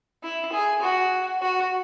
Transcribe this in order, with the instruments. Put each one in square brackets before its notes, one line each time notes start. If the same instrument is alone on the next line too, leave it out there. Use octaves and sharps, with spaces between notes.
[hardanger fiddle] E4
G#4
F#4
F#4